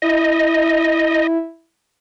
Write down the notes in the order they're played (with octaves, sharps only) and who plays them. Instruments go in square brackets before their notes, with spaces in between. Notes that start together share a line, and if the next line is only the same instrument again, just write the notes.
[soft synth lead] E4 [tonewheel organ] D#5